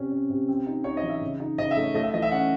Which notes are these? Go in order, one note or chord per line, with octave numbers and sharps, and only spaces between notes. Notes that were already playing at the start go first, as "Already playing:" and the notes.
Already playing: C3 C#4
C#4
C3
C4
D#4
D#4 C#5
D#5
E3
E5
C#3
D#4
C#3 D#5
E5
A3
C#5
A3 D#5
E5
E3 D#5
E5
C#4 F#5